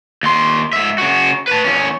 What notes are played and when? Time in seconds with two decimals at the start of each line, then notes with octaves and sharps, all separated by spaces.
0.23 D#2 C6
0.73 G#2 E5
0.98 C#3 F#4
1.48 B4 A5
1.64 E2 C#4